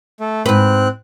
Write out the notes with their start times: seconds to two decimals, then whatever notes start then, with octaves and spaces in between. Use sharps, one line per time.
0.20 A3
0.46 G#2 C4 B4 F#6